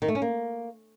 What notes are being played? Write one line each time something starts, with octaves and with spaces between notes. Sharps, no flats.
D#3
A3
C#4
A#3